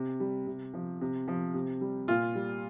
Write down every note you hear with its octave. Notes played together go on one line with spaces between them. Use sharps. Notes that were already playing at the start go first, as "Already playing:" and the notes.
Already playing: C3
G3
C3
F3
C3
F3
C3
G3
A#2 F4
G3